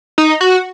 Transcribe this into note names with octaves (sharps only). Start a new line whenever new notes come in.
D#4
F#4